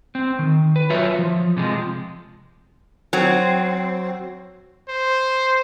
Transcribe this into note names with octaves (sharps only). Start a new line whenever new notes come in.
C4
D#3
B4
F#3 F4 C#5 E5
F3
C3 F3 G#3
F#3 C4
C5